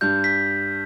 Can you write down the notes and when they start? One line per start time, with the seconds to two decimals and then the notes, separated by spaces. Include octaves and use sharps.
0.01 G2 G6
0.24 B6